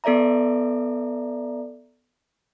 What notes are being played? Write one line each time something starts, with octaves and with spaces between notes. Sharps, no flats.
B3 A4 D5 E5 A#5